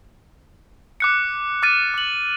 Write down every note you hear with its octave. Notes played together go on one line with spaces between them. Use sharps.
D6 F#6 C#7
D6 F6 A6 D#7
D6 F#7